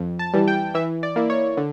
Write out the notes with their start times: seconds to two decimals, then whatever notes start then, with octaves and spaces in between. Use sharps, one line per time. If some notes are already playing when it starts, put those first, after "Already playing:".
Already playing: F2
0.19 A5
0.33 E3 G3
0.48 G5
0.74 E3 E5
1.03 D5
1.16 A#3 E4
1.30 C#5
1.57 D3